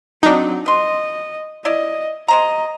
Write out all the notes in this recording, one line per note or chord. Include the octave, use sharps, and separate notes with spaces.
F#3 C4 D4 D#4
B4 D#5 C6
E4 D5 D#5
G#3 C5 D#5 A#5